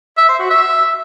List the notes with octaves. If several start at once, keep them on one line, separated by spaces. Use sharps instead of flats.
E5
C5
F#4
E5